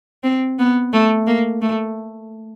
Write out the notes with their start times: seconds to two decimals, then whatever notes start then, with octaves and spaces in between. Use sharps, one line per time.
0.24 C4
0.59 B3
0.93 A3
1.27 A#3
1.61 A3